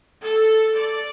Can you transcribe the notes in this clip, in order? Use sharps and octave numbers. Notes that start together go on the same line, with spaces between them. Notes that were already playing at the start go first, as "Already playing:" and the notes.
A4
D5